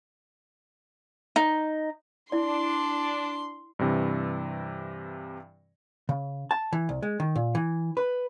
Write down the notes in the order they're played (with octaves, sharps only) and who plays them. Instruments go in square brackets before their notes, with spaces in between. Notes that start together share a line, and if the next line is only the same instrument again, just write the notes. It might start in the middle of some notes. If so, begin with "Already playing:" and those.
[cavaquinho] D#4
[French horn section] D4 [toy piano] E4 D5 [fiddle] C6
[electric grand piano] G2 C3 E3
[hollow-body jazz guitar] C#3
A5
E3
C2
G#3
D#3
A#2
E3
B4